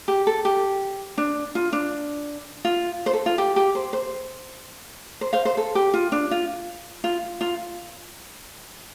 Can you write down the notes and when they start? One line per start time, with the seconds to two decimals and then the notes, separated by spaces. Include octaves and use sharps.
0.08 G4
0.27 A4
0.45 G4
1.18 D4
1.55 F4
1.73 D4
2.65 F4
3.06 C5
3.13 A4
3.26 F4
3.38 G4
3.56 G4
3.75 C5
3.93 C5
5.21 C5
5.33 C5 F5
5.45 C5
5.57 A4
5.75 G4
5.94 F4
6.12 D4
6.31 F4
7.04 F4
7.41 F4